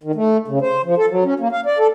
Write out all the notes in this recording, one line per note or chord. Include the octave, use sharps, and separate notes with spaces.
D#3
A3
C#3
C5
F3
A4
F#3
C#4
A#3
F5
D5
A4